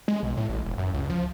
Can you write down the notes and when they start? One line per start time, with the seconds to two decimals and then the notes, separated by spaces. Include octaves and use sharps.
0.08 G#3
0.23 B1
0.37 A2
0.49 A1
0.65 E1
0.78 F#2
0.94 C#2
1.10 F3